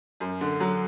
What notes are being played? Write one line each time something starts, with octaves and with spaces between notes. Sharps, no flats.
F#2
D3
F#3